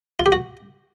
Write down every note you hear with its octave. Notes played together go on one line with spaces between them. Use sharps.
F4
G4
F#4